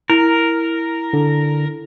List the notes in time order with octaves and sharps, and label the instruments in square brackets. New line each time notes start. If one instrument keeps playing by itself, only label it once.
[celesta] E4 [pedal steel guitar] A#4
[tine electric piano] D3